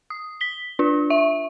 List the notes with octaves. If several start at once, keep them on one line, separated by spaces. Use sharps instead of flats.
D#6
B6 G7
D4 F4
E5